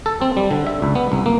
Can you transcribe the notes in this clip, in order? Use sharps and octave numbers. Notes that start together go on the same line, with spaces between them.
A4
C4
G3
D3
E5
C#2
B3
C2
A#3